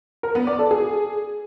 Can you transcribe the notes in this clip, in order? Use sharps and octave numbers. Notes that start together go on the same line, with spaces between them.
A#4
B3
D5
A4
G#4